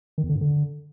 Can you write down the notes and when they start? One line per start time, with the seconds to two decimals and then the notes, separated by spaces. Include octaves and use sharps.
0.18 D#3
0.24 E2
0.29 D3
0.35 G2
0.41 D3